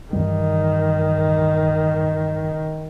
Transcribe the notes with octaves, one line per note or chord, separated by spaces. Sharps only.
G2 D#3 E3 G3